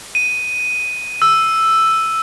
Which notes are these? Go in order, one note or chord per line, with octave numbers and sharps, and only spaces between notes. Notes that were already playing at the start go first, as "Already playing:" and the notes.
D#7
E6